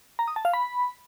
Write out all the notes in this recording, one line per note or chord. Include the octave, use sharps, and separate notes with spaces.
A#5
D#6
A5
F5
B5